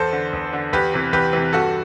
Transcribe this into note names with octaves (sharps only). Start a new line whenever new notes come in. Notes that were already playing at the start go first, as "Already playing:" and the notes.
Already playing: E2 A4 C5
D3
E2
D3
E2 G4 B4
C3 E3
E2 G4 B4
C3 E3
G2 F#4 A4